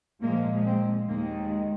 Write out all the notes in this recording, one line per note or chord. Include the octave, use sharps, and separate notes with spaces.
A#2 F3 G#3 A#3
C4
D#2 D#3 G#3 A#3